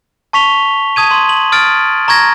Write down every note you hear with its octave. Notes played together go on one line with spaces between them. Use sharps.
A5 C#6 B6 F7 G7
A5 D#6 G#6 D#7
C6
F#7
D#6 F6 A6 D7
A#5 C#6 G#6 A#6